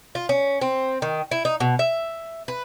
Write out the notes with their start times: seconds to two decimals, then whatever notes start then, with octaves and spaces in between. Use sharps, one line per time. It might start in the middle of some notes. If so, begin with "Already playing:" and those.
0.15 F4
0.29 C#4
0.61 C4
1.02 D#3
1.31 E4
1.45 D#4
1.60 B2
1.79 E5
2.48 B4